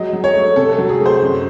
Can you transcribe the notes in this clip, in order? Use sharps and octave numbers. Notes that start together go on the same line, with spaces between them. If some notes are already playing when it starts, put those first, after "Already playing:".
Already playing: F#3 G#3 D#5
F#3
C#5
A3
C3 A4
A4
F#3
G#4
A3
C5
F#2